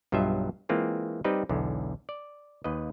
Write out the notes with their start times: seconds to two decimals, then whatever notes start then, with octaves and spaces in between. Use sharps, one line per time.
0.12 B1 G2 F#3 F4 D#5 E5
0.69 E3 G#3 A#3 C4 F4 G#4
1.24 G3 C4 D#4 G4 B4 D#5
1.49 B1 E2 D3
2.09 D5
2.64 D#2 B4 D#5